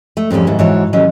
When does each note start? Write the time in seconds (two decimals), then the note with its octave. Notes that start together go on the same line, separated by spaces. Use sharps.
0.17 A3
0.31 F2 G#2 G3 G#3 C#4
0.47 D#2 G#2 F#3 E4
0.59 G#2 E3 F#4 C#5 A5
0.93 D#2 F#3 C#4 G4 A4 D#5